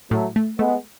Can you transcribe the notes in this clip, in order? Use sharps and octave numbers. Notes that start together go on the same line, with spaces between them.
A2 F#3 A3
A3
G#3 A3 B3